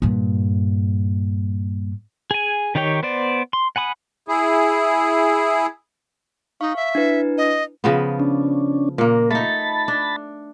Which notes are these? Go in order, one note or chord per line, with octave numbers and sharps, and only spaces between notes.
G2 A#2
G#4 G#5
D#3 D#4 G4 C#5 G5
B3 C5 D5
C6
F#5 G#5 B5 D#6
E4 G#4
D#4 F5 C#6
E5
D4 E4 B4
D#5
C#3 F3 B3
C#4 D4
A#2 A#3 A#4
A3 D#4 A5 B5 A6
D4